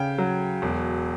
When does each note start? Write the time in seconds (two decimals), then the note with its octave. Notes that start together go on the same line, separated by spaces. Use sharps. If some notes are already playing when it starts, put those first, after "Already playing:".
Already playing: C#3 G5
0.18 F#3
0.62 E1